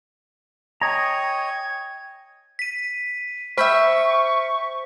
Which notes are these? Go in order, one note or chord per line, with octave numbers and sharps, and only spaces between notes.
C#5 D#5 G5 G#5 A#5 G#6
B6 D#7
C5 E5 G5 B5 C#6 B6